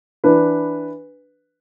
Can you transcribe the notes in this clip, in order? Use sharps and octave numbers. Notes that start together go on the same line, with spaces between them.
E3 D4 B4